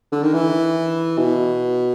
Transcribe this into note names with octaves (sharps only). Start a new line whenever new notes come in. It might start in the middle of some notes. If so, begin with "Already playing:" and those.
D3
D#3
E3
B2